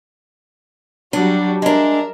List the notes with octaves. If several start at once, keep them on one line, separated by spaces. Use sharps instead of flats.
F#3 G3 D4 F#4
G#3 D4 A#4 E5